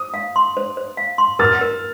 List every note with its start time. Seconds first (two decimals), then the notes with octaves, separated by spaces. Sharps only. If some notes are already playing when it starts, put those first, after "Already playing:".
Already playing: C5 D#6
0.14 F5
0.36 C6
0.57 C5
0.77 C5
0.97 F5
1.18 C6
1.39 A#4 F6 A6
1.61 A#4